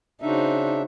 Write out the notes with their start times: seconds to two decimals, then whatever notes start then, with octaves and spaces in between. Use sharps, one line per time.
0.22 C#3 D4 D#4 F#4 C5 E5